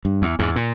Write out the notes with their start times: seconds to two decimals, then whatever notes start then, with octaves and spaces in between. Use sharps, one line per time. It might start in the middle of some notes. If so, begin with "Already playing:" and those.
0.05 G2
0.22 E2
0.39 E2 G#2
0.56 A#2